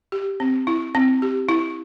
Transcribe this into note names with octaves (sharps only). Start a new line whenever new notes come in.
G4
C4
E4
C4
G4
E4